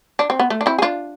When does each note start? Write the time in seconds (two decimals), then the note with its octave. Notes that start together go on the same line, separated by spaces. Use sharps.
0.19 D4
0.30 C4
0.39 B3
0.50 A3
0.61 D4
0.66 C4 E4
0.79 G#4
0.82 D4 F4